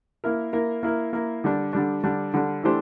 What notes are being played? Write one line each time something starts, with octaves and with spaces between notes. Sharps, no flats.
A#3 E4 A#4
A#3 E4 A#4
A#3 E4 A#4
A#3 E4 A#4
D3 G3 D4
D3 G3 D4
D3 G3 D4
D3 G3 D4
E3 A3 D4 G4 C5